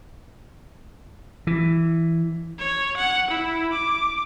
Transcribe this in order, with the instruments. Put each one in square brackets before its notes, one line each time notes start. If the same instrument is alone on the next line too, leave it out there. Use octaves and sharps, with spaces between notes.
[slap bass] E3
[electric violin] C#5
F#5
E4
D6